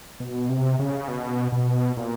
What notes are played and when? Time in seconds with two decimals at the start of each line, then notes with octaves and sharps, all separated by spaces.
0.20 B2
0.49 C3
0.79 C#3
1.08 B2
1.52 B2
1.97 A#2